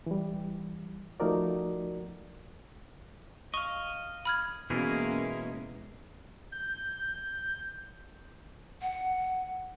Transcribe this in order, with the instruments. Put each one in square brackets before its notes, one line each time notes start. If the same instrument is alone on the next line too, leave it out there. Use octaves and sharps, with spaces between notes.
[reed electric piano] E3 G3
F3 A3 D#4 F#4 A#4 D5
[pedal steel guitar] D#5 F5 [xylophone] C#6
[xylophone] B5 F6 G#6
[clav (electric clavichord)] B2 E3 [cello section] G#3 A#3 C#4 [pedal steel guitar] E4 G#4 A#4
[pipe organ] G6
[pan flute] F#5